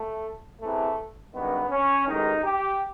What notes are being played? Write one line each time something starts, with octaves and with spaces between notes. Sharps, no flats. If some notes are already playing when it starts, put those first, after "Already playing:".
Already playing: A3
E2 C3 E3 A3
G#1 G2 D#3 B3
C#4
A1 G#2 D#3 D#4
G4